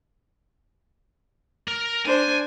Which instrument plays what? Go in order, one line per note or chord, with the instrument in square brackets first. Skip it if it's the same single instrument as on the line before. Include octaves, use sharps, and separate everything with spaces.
[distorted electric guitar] A#4
[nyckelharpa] D4 C5 [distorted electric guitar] G#5